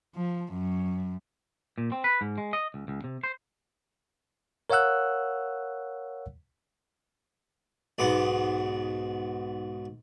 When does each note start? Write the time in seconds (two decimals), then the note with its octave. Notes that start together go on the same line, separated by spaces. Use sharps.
0.15 F3
0.54 F#2
1.78 A#2
1.92 C4
2.04 B4
2.21 G#2
2.38 G#3
2.53 D#5
2.74 C#2
2.88 C#2
3.04 C3
3.24 C5
4.70 A#4 C#5 F5 F#5 E6 F#6
7.98 B1 G#2 B3 D6